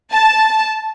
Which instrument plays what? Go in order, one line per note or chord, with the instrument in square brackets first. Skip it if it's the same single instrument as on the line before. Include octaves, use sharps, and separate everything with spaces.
[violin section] A5